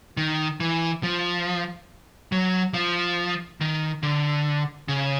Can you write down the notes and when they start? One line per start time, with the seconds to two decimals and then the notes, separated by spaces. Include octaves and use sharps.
0.17 D#3
0.60 E3
1.03 F3
2.32 F#3
2.74 F3
3.61 D#3
4.03 D3
4.88 C#3